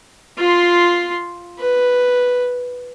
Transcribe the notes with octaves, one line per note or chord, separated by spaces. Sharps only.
F4 C6
B4